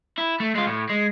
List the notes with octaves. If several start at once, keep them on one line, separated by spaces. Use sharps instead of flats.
E4
A3
G#3 F4
A2
G#3